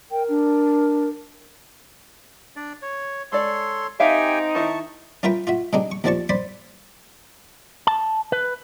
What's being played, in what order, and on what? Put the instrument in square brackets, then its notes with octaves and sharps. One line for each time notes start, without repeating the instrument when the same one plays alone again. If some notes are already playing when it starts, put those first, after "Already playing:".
[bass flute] A#4 [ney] G5
[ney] D4
[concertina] D4 D5
C#5
[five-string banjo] G#3 D5 [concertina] A4 C#5 C6
[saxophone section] C4 D#4 [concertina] G4 G5 G#5 [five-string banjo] E5 F5
[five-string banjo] D#3 E4 [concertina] A5 C#6
[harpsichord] C#4 F4 A#4 B4 E5 G5
F4 F#4 E5
C3 G#3 D4 D#4 G4
C#6
D#2 F3 C4 D5 A5 C#6
C5 D5 B5 C6
[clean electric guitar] A5
B4